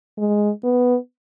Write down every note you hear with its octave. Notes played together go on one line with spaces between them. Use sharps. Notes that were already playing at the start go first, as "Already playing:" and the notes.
G#3
B3